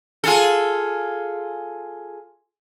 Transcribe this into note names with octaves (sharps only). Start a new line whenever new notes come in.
F4 G#4 A4